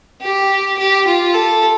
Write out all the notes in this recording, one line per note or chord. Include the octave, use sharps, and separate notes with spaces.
G4
G4
F4
A4